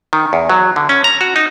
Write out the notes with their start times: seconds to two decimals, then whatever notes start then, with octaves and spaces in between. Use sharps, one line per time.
0.13 D#3
0.33 E2
0.49 F#3
0.76 D3
0.89 C#4
1.04 A#5
1.21 F#4
1.36 D#4